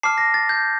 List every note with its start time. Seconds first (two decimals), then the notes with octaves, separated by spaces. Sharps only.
0.03 A5 D6 F6 C7
0.18 A#6
0.34 A6
0.49 G6